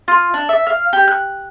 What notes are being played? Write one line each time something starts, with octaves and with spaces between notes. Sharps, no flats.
F4
D4
E5
F5
G4
F#6